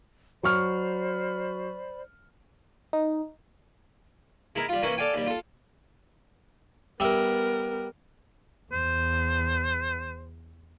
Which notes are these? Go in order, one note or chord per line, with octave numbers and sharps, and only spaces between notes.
F#3 C5 D5 B5 C#6 F6
D#4
G#3 E4 A#4
G3 F4
E3 A#3 C#4
A4 D5 F5 G5 G#5
D#2 G3
F4 A4
G3 B3 A#4 E5
E2 C5